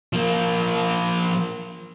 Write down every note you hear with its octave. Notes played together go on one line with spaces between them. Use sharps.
F3 A#3